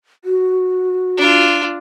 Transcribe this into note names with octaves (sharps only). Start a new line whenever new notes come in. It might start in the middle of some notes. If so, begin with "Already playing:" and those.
F#4
D4 F4